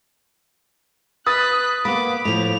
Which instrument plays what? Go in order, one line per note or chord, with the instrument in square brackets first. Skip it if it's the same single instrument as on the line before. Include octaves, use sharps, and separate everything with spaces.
[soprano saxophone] B4 [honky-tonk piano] D#6 A6 [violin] F#6 B6
[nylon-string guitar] A#3 B3 [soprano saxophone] B5 [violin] D6
[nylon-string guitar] A2 F3 [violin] F7